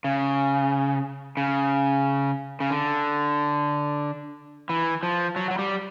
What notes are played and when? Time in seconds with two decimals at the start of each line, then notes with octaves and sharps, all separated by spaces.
0.04 C#3
1.37 C#3
2.60 C#3
2.70 D3
4.69 E3
5.03 F3
5.36 F#3
5.51 F#3
5.59 G3